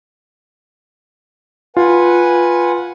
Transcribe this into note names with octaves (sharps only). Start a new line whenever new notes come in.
F4 B4 F#5 G#5